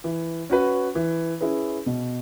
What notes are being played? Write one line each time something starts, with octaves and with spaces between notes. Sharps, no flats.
E3
C#4 F#4 B4
E3
C#4 E4 G#4 B4
B2